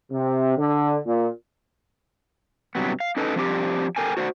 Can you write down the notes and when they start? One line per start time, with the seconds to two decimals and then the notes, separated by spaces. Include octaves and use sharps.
0.12 C3
0.58 D3
1.06 A#2
2.75 G2 C3 F#3 B3
3.00 F5
3.17 C#4 D#4 A4 B4
3.36 F3 C4 D4 G4 D5
3.96 A4 A#4 G5 G#5
4.17 F#4 C5 D5 E5 F#5